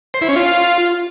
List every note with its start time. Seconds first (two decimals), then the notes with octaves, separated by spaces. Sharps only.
0.14 C5
0.21 E4
0.29 C#4
0.36 F4